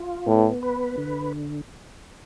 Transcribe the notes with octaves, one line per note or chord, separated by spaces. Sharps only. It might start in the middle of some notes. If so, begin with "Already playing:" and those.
Already playing: F4
A2 B3
B4
D3